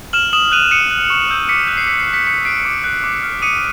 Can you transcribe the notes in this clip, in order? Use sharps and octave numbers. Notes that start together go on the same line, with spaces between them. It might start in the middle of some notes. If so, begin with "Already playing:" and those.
F6 E7 F#7
D#6 E7 F#7
F#6 D#7 F7
D#6 C#7 D#7
F#6
C#6
E6 G6
D6 B6 C#7
F#6
C7
D6 B6
C7
F#6
B6 C#7
D6 B6 C#7
F#6 C7 D7
D6
F#6
D6
F6
D#6 C#7 D#7